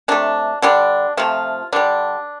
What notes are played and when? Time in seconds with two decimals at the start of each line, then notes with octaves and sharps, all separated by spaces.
0.08 C3 A3 D4
0.62 D3 G3 D4
1.17 C3 F3 A3 F4
1.73 D3 G3 D4